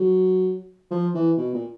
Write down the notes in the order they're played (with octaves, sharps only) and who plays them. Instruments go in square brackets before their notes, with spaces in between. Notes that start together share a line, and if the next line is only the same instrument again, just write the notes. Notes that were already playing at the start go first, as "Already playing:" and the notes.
Already playing: [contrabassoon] F#3
F3
E3
B2
A#2